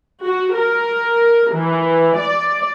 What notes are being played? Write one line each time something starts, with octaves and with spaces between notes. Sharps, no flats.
F#4
A#4
E3
D5